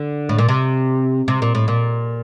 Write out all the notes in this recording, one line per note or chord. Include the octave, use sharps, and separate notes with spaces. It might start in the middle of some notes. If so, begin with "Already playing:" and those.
Already playing: D3
A2
A#2
C3
C3
A#2
A2
A#2